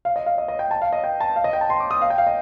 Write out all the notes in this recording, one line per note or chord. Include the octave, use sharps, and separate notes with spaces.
F5
D#5
F5
D#5
D#5
G5
A5
F5
D#5
G5
A5
F5
D#5
G5
A5
C6
D6
D#6
F5
G5
F5
D#5